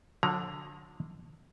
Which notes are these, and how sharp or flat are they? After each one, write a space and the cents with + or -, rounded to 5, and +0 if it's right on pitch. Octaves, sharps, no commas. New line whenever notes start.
D3 +0 F3 +45 A#5 +20